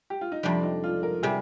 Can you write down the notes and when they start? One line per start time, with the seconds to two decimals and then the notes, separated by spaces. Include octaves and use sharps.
0.10 G4
0.21 F4
0.32 D#4
0.43 F2 C3 G3 D4
0.63 D#4
0.84 F4
1.03 A#4
1.23 C3 G3 G#4